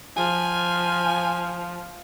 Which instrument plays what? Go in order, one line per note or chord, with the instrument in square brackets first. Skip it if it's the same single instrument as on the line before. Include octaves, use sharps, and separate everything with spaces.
[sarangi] F3 [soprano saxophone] G#5